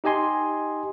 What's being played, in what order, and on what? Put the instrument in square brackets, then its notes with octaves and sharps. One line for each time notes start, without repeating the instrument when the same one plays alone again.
[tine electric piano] D#4 G4 D#5 G#5 C6